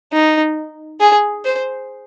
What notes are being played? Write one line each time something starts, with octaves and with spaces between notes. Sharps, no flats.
D#4
G#4
C5